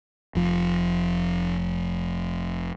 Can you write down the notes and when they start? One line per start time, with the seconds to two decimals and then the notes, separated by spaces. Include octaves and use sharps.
0.35 F1 F3